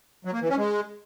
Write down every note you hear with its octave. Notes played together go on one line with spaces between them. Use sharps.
F#3
A#3
E3
C#4
G#3